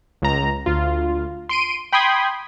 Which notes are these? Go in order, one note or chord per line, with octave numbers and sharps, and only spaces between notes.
C#2 A#5
D2 F4
C6 D7 D#7
G5 B5 C6 D#6 G#6